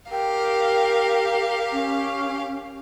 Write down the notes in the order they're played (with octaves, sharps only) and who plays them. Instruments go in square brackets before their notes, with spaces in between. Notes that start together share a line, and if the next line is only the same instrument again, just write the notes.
[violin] G4 F5 [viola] A#4 [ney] G5
[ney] C#4